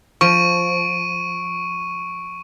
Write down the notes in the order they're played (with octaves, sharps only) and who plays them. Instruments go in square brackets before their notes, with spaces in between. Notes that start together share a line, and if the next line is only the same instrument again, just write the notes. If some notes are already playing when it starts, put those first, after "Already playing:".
[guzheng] F3 [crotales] C#6 D7 D#7